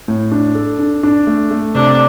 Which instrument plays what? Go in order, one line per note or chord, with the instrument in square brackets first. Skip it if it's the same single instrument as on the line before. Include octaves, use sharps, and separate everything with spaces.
[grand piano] A2
D4
A4
D4
D4
A3
A3
[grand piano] C3 [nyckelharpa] D4